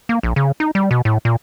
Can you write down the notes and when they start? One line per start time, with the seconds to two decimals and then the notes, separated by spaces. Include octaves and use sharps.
0.09 A#3
0.23 A#1
0.36 C#3
0.60 D#4
0.75 G3
0.91 B2
1.05 A2
1.25 A#2